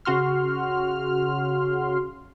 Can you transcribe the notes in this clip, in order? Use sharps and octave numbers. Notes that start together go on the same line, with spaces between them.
C#3 F#4 C6 F6